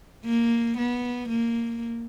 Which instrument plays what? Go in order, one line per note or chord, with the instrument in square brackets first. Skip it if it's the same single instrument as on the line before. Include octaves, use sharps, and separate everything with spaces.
[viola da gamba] A#3
B3
A#3